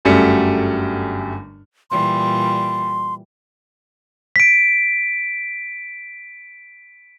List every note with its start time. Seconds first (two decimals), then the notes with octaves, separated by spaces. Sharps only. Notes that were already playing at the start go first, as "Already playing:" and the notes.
0.05 G1 F#2 G3 A3 C#7
1.91 A#2 E3 G3 C6
4.36 B6 D7